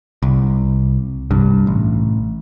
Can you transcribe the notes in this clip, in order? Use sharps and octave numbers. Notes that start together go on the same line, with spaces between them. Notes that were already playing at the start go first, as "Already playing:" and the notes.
C2
C2 G2
A1